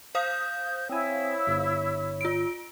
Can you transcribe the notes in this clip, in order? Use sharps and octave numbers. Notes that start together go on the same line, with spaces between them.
C5 F5 D#6 G6
C4 E4 C#5 G#5 E6
G1
F4 D7